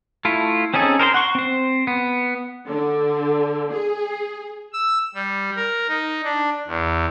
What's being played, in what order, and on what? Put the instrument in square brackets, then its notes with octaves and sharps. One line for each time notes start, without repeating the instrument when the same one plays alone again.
[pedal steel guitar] A3 E4 F4
C4 C#4 D#4 G#4 A4
A#4 C5 C#5 C6
F#5 C6 C#6
C4 C5
B3
[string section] D3
G#4
[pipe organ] E6
G3
A#4
D#4
D4
E2